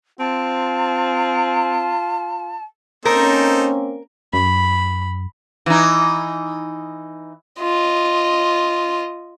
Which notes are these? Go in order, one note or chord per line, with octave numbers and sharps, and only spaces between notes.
C4 F4 A5
A#3 C4 C#4 D#4 A4 A#4 C5
F#2 B5
E3 D#4
F4 D#5